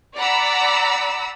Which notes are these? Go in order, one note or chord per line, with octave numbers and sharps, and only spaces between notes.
D5 F#5 A#5 B5 E6